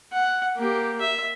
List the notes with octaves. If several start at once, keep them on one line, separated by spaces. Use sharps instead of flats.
F#5
A#3 G4
E5